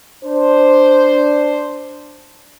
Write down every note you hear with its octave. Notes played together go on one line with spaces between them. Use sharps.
D4 C5